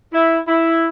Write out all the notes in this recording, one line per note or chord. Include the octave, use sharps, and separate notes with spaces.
E4
E4